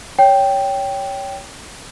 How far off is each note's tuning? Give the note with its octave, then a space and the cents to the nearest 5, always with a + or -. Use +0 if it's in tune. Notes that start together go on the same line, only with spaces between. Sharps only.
C#5 +15 G5 +0